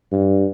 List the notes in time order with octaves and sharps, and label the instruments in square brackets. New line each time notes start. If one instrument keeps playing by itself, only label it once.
[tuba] G2